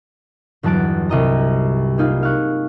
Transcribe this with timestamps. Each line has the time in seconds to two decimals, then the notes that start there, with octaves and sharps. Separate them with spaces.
0.63 G1 E2 F#3 A5 F#6 D7
1.09 C2 D#5 A#5
1.98 A#3 D#4 F4 G#4
2.23 F5 C#6 F#6